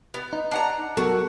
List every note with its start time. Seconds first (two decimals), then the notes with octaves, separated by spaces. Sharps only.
0.14 B3
0.33 D#4
0.51 D4 F#5 A#5
0.97 B1 B2 F#4 A4 A#4